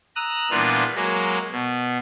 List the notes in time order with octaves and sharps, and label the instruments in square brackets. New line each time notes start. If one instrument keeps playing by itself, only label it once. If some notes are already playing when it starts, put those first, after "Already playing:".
[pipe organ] A#5 D#6 E6 F#6
A#2 E3 G3 B3 D4 F4
F#3 G#3 A#3
B2